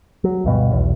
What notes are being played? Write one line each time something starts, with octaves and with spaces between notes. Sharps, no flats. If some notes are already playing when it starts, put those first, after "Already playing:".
F#3
D2 G2 B2
B1 E2